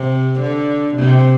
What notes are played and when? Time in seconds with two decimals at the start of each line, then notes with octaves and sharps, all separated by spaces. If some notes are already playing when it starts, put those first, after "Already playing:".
Already playing: C3
0.40 D3
0.95 C3